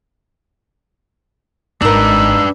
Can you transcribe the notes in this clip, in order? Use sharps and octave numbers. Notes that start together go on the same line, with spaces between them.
G#1 D4 D#4 A#4 B4 E6